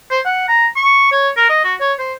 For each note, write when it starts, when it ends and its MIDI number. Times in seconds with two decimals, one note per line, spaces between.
0.11 0.20 72
0.26 0.47 78
0.48 0.67 82
0.76 1.11 85
1.12 1.29 73
1.37 1.46 70
1.49 1.59 75
1.64 1.74 66
1.80 1.93 73
1.99 2.13 72